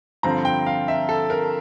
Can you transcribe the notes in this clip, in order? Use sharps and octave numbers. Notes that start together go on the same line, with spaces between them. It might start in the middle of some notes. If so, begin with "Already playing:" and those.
G2 D3 F3 C4 A#5
G5
F5
E5
A4
A#4